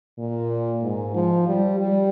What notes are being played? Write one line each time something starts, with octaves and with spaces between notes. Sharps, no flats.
A#2
G#2
F3
G3
G3